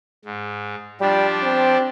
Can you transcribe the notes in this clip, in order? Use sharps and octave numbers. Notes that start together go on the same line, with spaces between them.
G#2
F3 G3 D4 G4
C4